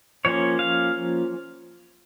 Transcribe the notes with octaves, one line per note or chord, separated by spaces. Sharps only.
F3 A#3 C#4 C#5
F5